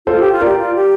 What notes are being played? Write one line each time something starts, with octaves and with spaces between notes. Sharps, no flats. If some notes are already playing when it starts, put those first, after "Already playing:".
F4 A4 C5
G4
F4
G4 A#4 D5
F4
G4